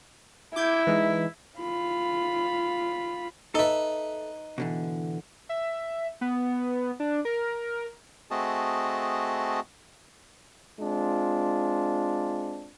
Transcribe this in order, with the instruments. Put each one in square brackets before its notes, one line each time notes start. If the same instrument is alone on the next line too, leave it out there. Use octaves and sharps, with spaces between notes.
[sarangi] E4 [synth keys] D6 G6 G#6
[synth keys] E3 G#3 D#4
[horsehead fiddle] F4 B5
[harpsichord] D#4 B4 [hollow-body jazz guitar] A4 E5
[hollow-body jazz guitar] B2 D3 E3
[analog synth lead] E5
B3
D4
A#4
[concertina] A3 C4 F#4 G#4 D#5 A5
[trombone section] G#3 C4 D4 F4